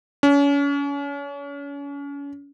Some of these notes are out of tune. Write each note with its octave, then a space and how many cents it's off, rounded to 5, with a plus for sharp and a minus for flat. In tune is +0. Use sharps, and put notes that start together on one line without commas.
C#4 +35